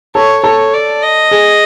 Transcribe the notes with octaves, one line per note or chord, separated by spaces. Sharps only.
A4 C#5
A4 C#5
D5
D#5
G#4